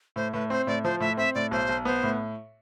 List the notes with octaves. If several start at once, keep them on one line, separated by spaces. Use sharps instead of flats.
A2 C5
A2 B4
C4 C5
A2 D5
F3 C5
A2 E5
C4 E5
A2 D5
B1 C5
B1
B3 C5
A2